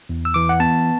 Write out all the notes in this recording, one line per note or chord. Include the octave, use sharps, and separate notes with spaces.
E2
E6
E3 D6
F#5
B3 A5